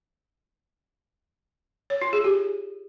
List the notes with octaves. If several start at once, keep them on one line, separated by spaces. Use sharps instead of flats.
C#5
F4
G#4
G4